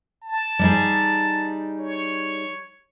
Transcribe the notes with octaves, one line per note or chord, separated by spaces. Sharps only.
A5
G3 D#4 G#4
C#5